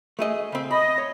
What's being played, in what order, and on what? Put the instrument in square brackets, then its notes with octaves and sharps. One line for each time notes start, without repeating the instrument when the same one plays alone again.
[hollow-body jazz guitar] A3 G#4 D#5
C#3 C4
[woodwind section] D#5 [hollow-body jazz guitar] B5
[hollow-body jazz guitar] C#5